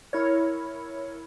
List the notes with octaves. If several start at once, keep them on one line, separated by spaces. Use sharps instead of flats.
E4 A#4 C#5